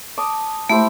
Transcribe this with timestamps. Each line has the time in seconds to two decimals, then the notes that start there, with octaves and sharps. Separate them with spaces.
0.17 A5 D6 D#6
0.69 A3 E4 G4 C5